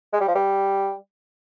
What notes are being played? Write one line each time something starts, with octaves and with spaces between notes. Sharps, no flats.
G#3
G3
F3
G3